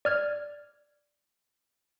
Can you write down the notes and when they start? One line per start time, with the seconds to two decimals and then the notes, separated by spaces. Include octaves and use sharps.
0.05 D5 F6 G#6